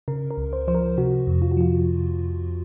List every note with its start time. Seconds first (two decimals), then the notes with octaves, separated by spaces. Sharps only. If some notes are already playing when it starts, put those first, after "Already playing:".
0.08 C#3 A#4
0.31 A#4
0.37 C#2
0.53 C5
0.68 F3 C5
0.75 A#4
0.97 C3 F#4
1.27 F2
1.42 F4
1.51 F#4
1.57 F3 F4